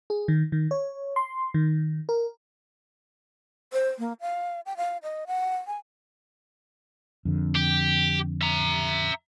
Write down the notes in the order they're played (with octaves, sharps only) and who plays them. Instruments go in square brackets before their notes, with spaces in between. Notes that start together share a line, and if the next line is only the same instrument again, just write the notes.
[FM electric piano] G#4
D#3
D#3
C#5
C6
D#3
A#4
[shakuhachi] C5
A#3
F5
G5
F5
D#5
F#5
G#5
[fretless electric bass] F2 D3
[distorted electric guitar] G4
E5 A#5